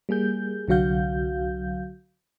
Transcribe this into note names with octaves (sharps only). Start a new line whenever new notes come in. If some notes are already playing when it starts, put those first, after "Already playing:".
G3 A#3 G#4 G6
C2 D3 F#3 F#4 F5 G6